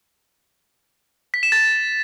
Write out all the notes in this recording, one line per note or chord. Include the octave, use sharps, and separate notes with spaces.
B6
E7
A6